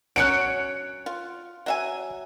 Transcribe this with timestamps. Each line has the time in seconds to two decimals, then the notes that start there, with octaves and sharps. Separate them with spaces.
0.16 F#3 C#4 C#5 F#6 C#7 D7
1.06 F4
1.66 F#3 E5 G#5